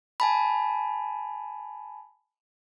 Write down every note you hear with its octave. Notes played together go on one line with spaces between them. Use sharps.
G#5 A5 B5